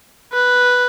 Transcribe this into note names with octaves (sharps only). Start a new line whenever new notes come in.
B4